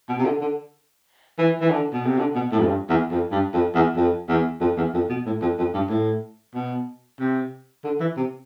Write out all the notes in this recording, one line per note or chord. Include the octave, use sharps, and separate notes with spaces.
B2
C3
D3
D3
E3
E3
D3
B2
C3
D3
B2
A2
F2
G2
E2
F2
G2
F2
E2
F2
E2
F2
E2
F2
B2
A2
F2
F2
G2
A2
B2
C3
D3
E3
C3